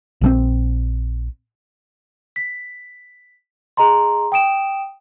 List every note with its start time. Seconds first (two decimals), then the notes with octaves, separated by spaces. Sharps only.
0.21 A#1 E3 C4
2.36 B6
3.77 G#4 D#5 A#5 C6
4.32 G5 D#6 D7 E7